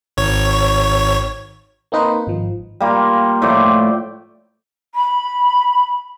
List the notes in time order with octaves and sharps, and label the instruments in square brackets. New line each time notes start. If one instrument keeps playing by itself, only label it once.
[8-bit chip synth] G#1 C#5
[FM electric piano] A#3 C4 D#4 B4 C5
G#1 F3
[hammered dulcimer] G3 A#3 F4
A2 F3 D5 G5
[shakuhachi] B5